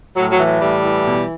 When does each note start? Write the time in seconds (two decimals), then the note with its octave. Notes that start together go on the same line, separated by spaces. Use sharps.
0.16 A2 F#3
0.32 F#3
0.40 E3
0.46 F#3
0.61 A2 G3
0.83 E3
1.06 B2